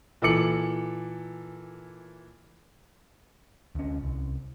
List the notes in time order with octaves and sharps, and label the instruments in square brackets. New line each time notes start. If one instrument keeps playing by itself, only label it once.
[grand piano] A#2 E3 A4 D6 C#7 F#7
[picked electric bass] D2 C#4
C2